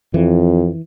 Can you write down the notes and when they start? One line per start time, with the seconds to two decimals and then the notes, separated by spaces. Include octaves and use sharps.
0.14 F2 E3